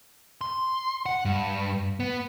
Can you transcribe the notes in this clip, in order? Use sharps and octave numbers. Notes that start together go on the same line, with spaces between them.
C6
F#5
G2
B3